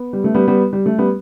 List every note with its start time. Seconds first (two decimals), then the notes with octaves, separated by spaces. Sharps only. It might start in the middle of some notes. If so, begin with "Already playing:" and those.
Already playing: B3
0.13 G3
0.24 A3
0.34 G3 B3
0.48 G3 B3
0.73 G3
0.86 A3
0.98 G3 B3